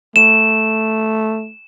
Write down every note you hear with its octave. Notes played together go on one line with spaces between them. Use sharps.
A3 E7